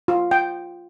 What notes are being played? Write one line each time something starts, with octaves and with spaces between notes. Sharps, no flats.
F4
G5